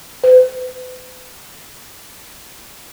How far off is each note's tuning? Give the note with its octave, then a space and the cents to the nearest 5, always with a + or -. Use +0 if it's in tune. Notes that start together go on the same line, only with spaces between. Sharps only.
B4 +45